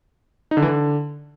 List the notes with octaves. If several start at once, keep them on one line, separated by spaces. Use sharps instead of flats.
D#4
D3
E3
D3